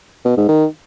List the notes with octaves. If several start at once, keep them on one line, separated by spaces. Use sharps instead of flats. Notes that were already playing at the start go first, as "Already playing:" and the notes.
B2
G#2
D#3